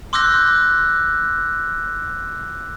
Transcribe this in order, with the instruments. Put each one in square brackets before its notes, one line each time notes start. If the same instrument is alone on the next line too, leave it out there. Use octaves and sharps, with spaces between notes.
[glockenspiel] C6 D6 E6 F#6 G6 A#6